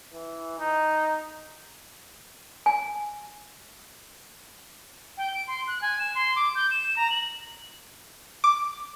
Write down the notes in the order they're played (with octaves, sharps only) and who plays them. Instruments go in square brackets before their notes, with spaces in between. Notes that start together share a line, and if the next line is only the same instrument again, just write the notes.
[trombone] E3
D#4
[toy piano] G#5
[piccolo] G5
D7
C6
F#6
G#5
E7
C6
D6
G6
E7
A#5
F#7
[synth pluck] D6